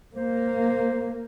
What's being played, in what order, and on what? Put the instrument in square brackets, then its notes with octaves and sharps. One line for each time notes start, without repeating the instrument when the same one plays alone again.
[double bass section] A#3 [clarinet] C5